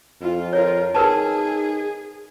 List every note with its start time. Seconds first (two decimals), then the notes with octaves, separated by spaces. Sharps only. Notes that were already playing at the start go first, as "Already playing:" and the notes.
0.21 F2 F4
0.53 F4 A#4 C#5
0.95 D#4 G#4 A#4 B4 A5